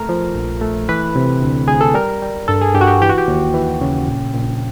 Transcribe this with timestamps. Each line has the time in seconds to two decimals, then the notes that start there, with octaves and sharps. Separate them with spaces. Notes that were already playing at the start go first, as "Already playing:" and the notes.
Already playing: A3 A#4
0.09 F3
0.35 A#1
0.61 A3
0.89 E3 B4
1.15 C3
1.42 D2
1.67 D2 G#4
1.81 A4
1.94 G3 A#4
2.22 G3
2.48 G2 A4
2.61 G#4
2.74 G2 G4
2.81 F#4
2.87 G4
3.01 E3 G4
3.09 F#4
3.18 G4
3.28 D#2
3.54 E3
3.81 C#3
4.08 A#1
4.34 A#1